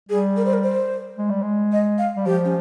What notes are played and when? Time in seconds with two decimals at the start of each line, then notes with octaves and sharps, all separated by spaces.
0.09 G3 G#4
0.37 A#4
0.46 C5
0.53 A#4
0.63 C5
1.17 G#3
1.30 G3
1.43 G#3
1.72 D#5
1.98 F5
2.17 G3
2.26 F3 G4
2.45 C#4